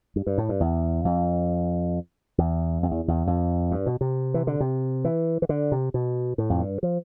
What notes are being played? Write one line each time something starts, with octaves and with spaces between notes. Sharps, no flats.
G2
G2
A2
G2
E2
F2
E2
F2
E2
E2
F2
G2
B2
C3
E3
D3
C3
E3
E3
D3
C3
B2
A2
F2
G2
F3